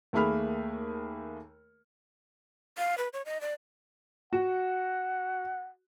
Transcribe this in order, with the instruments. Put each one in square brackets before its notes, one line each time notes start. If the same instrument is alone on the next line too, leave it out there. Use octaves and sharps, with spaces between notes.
[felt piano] D#2 A3 A#3 G#4 B5 F6
[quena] F5
B4
C#5
D#5
D5
[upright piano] F#4 [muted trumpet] F#5